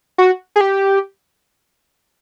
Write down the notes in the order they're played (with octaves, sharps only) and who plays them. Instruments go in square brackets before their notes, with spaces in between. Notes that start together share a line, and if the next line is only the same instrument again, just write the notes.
[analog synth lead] F#4
G#4
G4